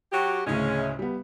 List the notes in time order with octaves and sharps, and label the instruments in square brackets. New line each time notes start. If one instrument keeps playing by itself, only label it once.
[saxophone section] F#3 F#4 G4
[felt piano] D2 A2 C#3 [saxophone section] G#3 C#4
[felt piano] G3 B3